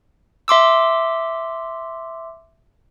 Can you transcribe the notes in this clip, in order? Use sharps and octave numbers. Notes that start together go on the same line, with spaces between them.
E5 C6 D6 E6